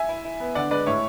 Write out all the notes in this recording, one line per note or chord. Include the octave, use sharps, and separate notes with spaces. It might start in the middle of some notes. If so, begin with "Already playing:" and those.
Already playing: E5 G#5
E4
E4
B3
D3 D5 F#5
G#3 B4 D5
A2 C#5 E5